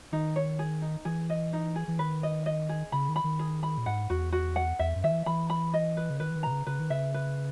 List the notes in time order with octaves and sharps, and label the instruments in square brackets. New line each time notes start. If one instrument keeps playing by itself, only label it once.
[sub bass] D#3 [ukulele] D#4
[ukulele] C#5
G#4
D#4
[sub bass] E3 [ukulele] G#4
[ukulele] D#5
D#4
G#4
[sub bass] E3
[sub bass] D#3 [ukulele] B4
[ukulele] D#5
D#5
G#4
[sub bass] C#3 [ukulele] B5
[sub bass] D#3
[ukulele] B5
[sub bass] D#3
[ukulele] G#4
B5
[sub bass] A#2
[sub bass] G#2 [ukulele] F#5
[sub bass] E2 [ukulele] F#4
[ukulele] F#4
F#5
[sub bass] E2 [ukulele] E5
[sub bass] F#2
[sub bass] D#3 [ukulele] E5
[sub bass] E3
[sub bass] E3 [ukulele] B5
[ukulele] B5
D#5
B4
[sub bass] C#3
[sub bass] D#3 [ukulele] B4
[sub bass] E3
D#3
[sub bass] B2 [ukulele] A#5
[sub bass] C#3
[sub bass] C#3 [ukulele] B4
[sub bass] D#3
[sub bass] C#3 [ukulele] E5
[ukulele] B4